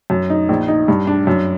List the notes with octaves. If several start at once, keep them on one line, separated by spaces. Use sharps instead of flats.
F#2
D#4
A#1
D#4
G2
D4
F#2